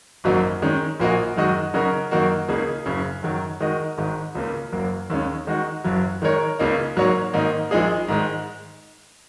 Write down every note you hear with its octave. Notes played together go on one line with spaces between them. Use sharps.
G#1 F#2 F#3 A#3 D#4
D#3 G#3 C#4
A#1 A#2 A#3 F#4 D#5
F#2 D#3 G#3 F#4 D#5
C#3 F#3 D#4 F#4 A#4
F#2 D#3 A#3 D#4 F#4
C#2 C#3 A#3 D#4 G#4
F#1 F#2 C#3
F#2 D#3 F#3
D#3 G#3 F#4 A#4 D#5
G#1 G#2 D#3 G#3
C#2 C#3 A#3
F#1 F#2 F#3 A#3
D#2 D#3 G#3 C#4
D#3 G#3 D#4 F#4
F#1 F#2 F#3
D#3 G#3 D#4 A#4 C#5
C#2 C#3 A#3 D#4
G#2 F#3 A#3 F#4 C#5
G#2 D#3 A#3 D#4
A#1 A#2 G#3 D#4 G#4
G#2 D#3 G#3